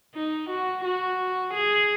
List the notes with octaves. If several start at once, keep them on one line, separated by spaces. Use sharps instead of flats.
D#4
F#4
F#4
G#4